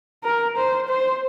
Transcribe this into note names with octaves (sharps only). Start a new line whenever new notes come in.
A#4
C5
C5